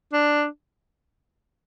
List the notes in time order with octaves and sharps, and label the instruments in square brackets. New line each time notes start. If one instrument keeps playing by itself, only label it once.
[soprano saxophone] D4